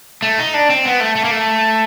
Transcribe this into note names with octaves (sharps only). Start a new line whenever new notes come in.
A3
D#4
D4
C4
B3
A3
A3
A#3
A3